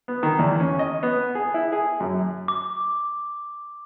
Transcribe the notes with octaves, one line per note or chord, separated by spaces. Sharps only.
B3
D#3
E2
C#4
D#5
B3
G#4
E4
G#4
F#2
D6